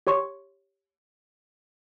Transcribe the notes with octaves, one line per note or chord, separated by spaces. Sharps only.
G4 C#5 C6 C#6